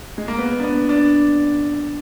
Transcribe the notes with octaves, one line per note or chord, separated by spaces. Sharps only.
G#3
A#3
B3
D4
B3
D4